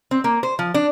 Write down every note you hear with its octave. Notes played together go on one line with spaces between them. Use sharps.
C4
A#3
C5
F3
D4